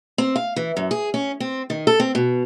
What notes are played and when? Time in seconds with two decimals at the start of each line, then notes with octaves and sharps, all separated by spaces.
0.18 C4
0.36 F5
0.56 E3
0.77 F#2
0.91 G#4
1.14 C#4
1.40 C4
1.70 D#3
1.87 A4
2.00 C4
2.15 B2